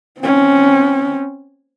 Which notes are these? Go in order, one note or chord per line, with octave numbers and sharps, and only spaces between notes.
C4 C#4